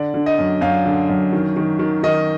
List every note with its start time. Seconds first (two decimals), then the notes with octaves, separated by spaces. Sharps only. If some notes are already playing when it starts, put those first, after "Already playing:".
Already playing: D3 D5
0.14 D3
0.26 D#5
0.38 F#2
0.61 F#2 F5
0.86 D3
1.09 F#2
1.33 D#3
1.56 D#3
1.79 D#3
2.03 D#3 D#5